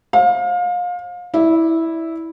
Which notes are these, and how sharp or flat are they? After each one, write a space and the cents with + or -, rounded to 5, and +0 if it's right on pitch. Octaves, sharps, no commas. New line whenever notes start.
C5 +40 F5 +30
E4 -10 D5 +0